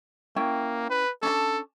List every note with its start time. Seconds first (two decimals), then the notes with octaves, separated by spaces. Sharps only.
0.36 A#3 C#4 E4 G5
0.90 B4
1.23 C#4 D4 A4 A5